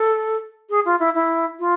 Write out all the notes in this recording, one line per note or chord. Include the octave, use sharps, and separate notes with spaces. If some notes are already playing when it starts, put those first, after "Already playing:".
Already playing: A4
G#4
F4
E4
E4
F4